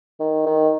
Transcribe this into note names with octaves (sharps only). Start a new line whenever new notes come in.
D#3
D#3